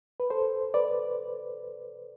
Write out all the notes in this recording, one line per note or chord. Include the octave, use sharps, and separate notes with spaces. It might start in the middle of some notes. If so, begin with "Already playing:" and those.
B4
A4 C5
B4 D5